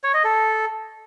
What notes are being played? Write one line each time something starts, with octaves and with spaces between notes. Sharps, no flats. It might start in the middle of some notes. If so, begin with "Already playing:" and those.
C#5
D#5
A4